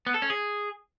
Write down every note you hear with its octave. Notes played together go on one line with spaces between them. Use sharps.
B3
A4
C#4
G#4